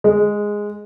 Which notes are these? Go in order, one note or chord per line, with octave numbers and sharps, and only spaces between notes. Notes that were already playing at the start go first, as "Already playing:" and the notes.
G#3